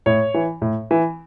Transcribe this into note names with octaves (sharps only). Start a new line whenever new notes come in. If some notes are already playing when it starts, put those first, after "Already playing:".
A2 C#5
E3
A2
E3